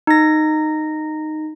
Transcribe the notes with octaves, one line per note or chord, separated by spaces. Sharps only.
D#4 A#6